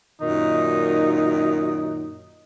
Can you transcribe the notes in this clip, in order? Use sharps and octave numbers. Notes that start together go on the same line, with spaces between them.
F#2 A#2 D#3 D#4